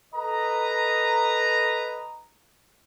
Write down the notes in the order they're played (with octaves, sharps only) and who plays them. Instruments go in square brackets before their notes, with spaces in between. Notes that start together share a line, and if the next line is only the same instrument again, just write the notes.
[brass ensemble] A4 B4 D#5 A#5